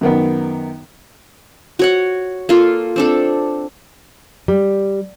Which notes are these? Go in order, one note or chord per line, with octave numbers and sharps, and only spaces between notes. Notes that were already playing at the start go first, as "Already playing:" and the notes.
F#2 D#3 B3
F#4 C#5 F#5
A#3 F4 A4
C4 D4 A4
G3